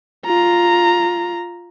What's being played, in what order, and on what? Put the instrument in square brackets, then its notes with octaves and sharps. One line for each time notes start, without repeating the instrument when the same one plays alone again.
[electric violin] F4 A#5